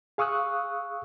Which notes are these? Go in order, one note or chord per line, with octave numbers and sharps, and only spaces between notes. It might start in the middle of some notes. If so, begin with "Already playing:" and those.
G#4 F5 C#6 D#6 E6 F#6